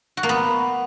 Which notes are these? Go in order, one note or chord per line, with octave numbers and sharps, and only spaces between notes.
F#4
A#3
B3